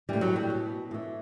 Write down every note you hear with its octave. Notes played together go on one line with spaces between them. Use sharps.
A2 E3 G3
F#3
G3
B2
A2 E3